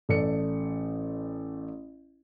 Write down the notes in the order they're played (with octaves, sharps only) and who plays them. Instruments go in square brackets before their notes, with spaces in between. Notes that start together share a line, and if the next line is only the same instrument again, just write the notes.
[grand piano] A1 A4 D5 C#7